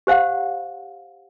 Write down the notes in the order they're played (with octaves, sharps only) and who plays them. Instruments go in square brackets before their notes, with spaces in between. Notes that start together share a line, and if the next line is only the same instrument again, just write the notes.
[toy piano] G4 C5 F5 F#5